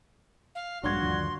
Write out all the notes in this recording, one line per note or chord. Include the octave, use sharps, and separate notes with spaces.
F5
A#1 G2 A#2 G#3 F#4 C6 G#6
D#2 D3 F3